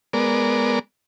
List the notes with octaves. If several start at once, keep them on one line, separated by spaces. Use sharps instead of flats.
G#3 B3 A#4 D5